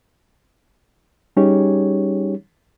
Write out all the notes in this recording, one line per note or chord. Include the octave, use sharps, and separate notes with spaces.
G3 C#4 D#4 G4 G#4 C#5